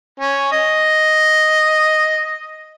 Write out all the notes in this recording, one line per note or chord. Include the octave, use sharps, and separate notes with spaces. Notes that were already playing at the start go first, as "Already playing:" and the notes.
C#4
D#5